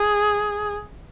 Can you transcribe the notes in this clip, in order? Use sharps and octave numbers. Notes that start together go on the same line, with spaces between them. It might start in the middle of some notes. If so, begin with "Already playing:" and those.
Already playing: G#4